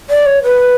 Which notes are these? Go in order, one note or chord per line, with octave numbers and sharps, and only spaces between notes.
D5
C#5
B4